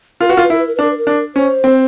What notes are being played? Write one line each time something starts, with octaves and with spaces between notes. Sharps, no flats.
F4 A#4
F#4 B4
F4 A#4
B4
E4 A#4
B4
A#4
B4
D4
A#4
B4
A#4
D4
C#4 C5
C4